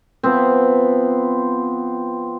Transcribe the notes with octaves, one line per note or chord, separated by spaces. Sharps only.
F3 B3 C4